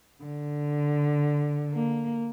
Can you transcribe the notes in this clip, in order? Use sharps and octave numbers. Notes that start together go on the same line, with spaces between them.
D3
A#3